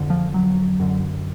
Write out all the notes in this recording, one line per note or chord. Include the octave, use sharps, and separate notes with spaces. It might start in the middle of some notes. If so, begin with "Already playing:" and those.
Already playing: F2 D3
F3
F#3
F#2 D3